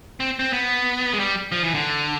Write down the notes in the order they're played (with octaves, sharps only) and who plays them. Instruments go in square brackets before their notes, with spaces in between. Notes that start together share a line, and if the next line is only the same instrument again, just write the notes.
[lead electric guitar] C4
C4
B3
G#3
G3
F3
E3
D3